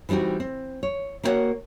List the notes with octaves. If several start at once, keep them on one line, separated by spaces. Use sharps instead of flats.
E3 G3 C4 D#4 F#4
C4
C#5
A#3 E4 F#4 C5 C#5 F#5